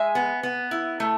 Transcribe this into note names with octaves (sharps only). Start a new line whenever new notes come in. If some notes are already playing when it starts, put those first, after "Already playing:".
Already playing: G#3 E5 G#5
B3
B3
E4
A3